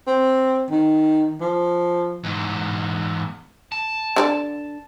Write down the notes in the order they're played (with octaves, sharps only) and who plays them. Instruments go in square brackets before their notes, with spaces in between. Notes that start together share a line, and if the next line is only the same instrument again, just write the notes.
[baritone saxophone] C4
D#3
F3
[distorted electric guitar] E2 G#2
A5
[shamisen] D3 D4 D5